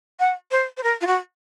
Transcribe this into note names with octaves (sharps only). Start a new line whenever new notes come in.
F#5
C5
C5
A#4
F4
F#4